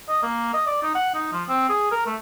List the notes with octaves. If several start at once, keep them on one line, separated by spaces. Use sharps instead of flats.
D#5
A#3
D#5
D5
D#4
F#5
D#4
F3
C4
G#4
A#4
A3